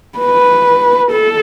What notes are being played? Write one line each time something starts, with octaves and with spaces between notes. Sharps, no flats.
B4
A4